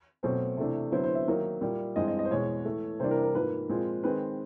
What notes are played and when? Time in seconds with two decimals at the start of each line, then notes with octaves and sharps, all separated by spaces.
0.23 B2 F#3 A3 C4 C5
0.57 C3 E3 A3 D4
0.92 D3 F#3 B3 E4 C5
1.04 C5
1.15 E5
1.28 D#3 F#3 A#3 D#4
1.61 A#2 G3 A#3
1.96 G2 E3 G#3 C4 D#5
2.08 D#5
2.19 D#5
2.25 C5
2.30 E2 B2 G#3 C#5
2.65 A2 E3 A3
3.00 C3 E3 G3 A#3 D4 C5
3.11 A#4
3.23 A#4
3.35 G#2 F3 A#3 B4
3.69 A#2 F3 G#3 C4
4.04 D#3 G#3 C4 B4